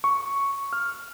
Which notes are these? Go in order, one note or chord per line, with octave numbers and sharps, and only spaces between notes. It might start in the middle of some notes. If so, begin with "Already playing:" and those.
C#6
F6